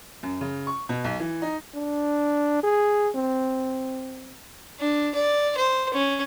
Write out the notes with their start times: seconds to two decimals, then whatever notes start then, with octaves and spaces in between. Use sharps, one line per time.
0.23 F#2
0.41 C#3
0.67 C#6
0.89 B2
1.04 B1
1.20 E3
1.42 D#4
1.74 D4
2.63 G#4
3.15 C4
4.79 D4
5.15 D5
5.57 C5
5.94 C#4